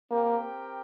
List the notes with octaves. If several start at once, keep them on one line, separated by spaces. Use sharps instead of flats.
A#3 C4 G4 A#4 G5